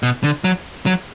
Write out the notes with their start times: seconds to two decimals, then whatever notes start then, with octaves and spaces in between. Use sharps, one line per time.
0.03 B2
0.24 D3
0.44 F#3
0.86 F#3